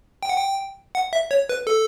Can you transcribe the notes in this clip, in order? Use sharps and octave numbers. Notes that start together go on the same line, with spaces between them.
G5
F#5
G5
F#5
E5
C#5
B4
A4